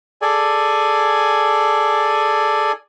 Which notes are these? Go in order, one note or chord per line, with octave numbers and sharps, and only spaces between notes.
G#4 A4 D5 G#5